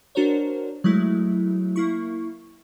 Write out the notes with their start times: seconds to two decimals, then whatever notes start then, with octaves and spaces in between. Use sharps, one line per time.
0.15 D4 F#4 A#4 C5 C#5
0.84 F#3 G#3 A3 E4
1.76 A#3 E4 C#6